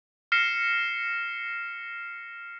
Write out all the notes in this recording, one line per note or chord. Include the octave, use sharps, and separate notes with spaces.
F6 A#6 C7 C#7 E7